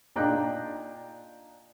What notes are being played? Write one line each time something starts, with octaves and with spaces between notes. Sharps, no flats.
A#2 D4 D#4 G5 F#6